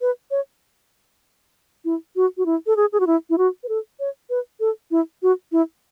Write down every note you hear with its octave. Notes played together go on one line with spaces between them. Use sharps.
B4
C#5
E4
F#4
F#4
E4
A4
G#4
G#4
F#4
E4
E4
F#4
B4
A4
C#5
B4
A4
E4
F#4
E4